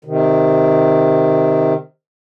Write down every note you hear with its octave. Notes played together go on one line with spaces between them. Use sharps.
C3 D#3